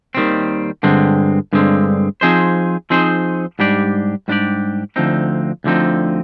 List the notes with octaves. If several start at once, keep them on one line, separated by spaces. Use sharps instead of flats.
D#2 D#3 G3 C4
G2 D3 G#3 C4
G2 D3 G#3 C4
F3 C4 D#4 G#4 C5
F3 C4 D#4 G#4 C5
G#2 G3 D4 G4 D5
G#2 G3 D4 G4 D5
D2 D3 F3 C4 D#4
D2 D3 F3 C4 D#4